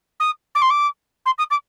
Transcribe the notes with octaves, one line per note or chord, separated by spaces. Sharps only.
D#6
D6
C6
D6
C6
D#6
D6